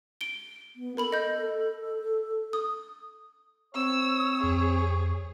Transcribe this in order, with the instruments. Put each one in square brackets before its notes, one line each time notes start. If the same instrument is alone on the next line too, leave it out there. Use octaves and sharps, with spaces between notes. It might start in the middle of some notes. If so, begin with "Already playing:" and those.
[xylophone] D7 G7
[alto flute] B3
[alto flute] A4 [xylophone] A#4 B5 F#7
[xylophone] D#5 G6
D#6
[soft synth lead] C4 [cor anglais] C#5 [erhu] E6
[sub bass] F2 [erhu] G#4